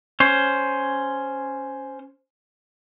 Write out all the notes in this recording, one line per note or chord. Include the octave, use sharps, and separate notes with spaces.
C#4 C5